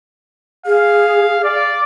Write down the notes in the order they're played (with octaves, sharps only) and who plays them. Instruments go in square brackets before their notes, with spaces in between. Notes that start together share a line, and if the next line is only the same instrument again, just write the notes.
[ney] G#4 [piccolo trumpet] F5
[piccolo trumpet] D5